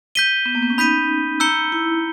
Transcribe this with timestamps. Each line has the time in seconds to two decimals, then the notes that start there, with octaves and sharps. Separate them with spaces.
0.15 G6 B6 D#7 G7
0.46 B3
0.55 A#3
0.62 B3
0.70 C#4
0.78 D#4 B5 G6 B6 D#7
1.40 A#5 E6 G6 C#7 G7
1.72 E4